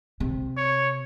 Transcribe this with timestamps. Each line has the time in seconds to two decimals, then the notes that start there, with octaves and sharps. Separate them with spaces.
0.20 C3
0.57 C#5